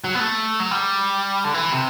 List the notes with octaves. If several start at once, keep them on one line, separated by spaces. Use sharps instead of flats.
F#3
B3
A3
F#3
G3
D3
E3
C3